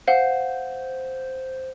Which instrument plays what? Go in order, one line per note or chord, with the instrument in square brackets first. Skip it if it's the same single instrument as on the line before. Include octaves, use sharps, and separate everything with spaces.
[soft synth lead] C5 [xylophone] F5 F#5